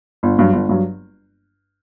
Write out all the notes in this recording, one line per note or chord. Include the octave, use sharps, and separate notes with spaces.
G1
G2 F#3
G1
G2 F#3